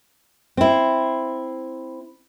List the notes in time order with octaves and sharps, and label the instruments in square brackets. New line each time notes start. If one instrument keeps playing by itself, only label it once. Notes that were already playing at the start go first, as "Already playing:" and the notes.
[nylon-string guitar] C4 E4